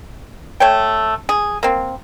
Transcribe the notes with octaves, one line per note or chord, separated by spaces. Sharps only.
A3 C#5 G5
G#4
A#3 C4